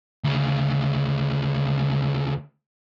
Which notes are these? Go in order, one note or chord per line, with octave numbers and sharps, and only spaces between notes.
D2 C#3